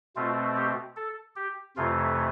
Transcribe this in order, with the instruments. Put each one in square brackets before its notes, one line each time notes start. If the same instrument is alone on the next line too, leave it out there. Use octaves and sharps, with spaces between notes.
[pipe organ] B2 A3 C4 F4
G4
A4
G4
F2 C3 E3 A3 F4